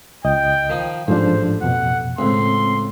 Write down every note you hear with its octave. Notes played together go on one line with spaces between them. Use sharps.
C#2 D#5 G5
D#3 F3 D#4
A1 G#2 F3 D4 C5
F2 B2 F#5
C#2 A2 C4 C6